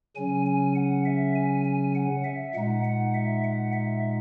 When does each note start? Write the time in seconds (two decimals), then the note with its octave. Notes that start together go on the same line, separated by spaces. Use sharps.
0.16 C#3 F#3 C#4 G#5
0.46 G#5
0.75 F#5
1.06 E5
1.35 G#5
1.65 G#5
1.95 F#5
2.25 E5
2.54 A#2 G#3 D#4 F#5
2.84 F#5
3.14 E5
3.44 F#5
3.73 E5